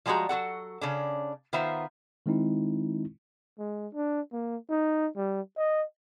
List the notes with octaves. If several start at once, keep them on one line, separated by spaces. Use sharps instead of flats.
F3 G3 G#3 D4 F#4 A#5
F#3 F#4 A4 F#5
C#3 C#4 D4
D#3 B3 F4 C5 E5 A#5
D#3 G#3 C4 D#4 E4
G#3
D4
A#3
D#4
G3
D#5